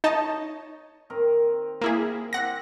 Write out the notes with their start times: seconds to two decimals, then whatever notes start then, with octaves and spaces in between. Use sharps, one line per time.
0.04 D#4 C#5 D#5 A5
1.10 D#3 C4 A#4
1.82 A#3 E4 G#4
2.33 C4 G4 F#5 A#6